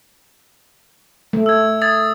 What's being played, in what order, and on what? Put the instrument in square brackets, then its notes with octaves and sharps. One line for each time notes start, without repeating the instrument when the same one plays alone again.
[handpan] A3
[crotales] E6 G#6
D#6 G#6 A6